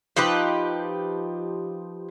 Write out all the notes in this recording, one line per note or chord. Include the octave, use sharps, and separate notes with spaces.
F3 D#4 G4 B4